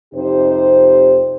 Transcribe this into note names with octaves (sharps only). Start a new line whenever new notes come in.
F2 C3 D#4 G4 C5